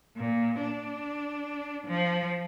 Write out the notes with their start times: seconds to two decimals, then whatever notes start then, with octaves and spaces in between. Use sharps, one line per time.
0.16 A#2
0.60 D4
1.87 F3